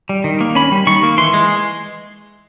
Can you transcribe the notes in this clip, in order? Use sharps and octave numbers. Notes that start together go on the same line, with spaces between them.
G3
D#3
A#3
C#4 B5
G3
D#3 C#6
A#3
E3 C6
G#3